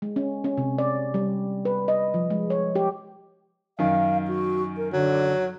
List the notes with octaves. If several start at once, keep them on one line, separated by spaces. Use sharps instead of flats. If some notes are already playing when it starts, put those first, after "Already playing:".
G#3
C#4
C#4
C3
D5
G3
B4
D#5
F3
G#3
C#5
G4
F#2 D#3 F5
F#4
A#4
D3 F#3